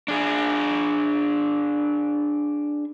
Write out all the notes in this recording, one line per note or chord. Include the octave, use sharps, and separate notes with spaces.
D4 G#4